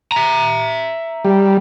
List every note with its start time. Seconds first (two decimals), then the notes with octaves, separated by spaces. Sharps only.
0.12 E5 A#5
1.25 G3